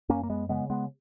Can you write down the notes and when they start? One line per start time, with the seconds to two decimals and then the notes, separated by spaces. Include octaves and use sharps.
0.09 F#2 A#3 C#4
0.23 A#3
0.30 G#3 B3
0.49 C#3 G#3 B3
0.70 G#3 B3